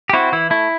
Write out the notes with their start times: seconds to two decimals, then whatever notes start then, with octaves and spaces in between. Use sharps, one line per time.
0.09 G4
0.13 C4 E4 F#4
0.32 E3 E4
0.50 A3 E4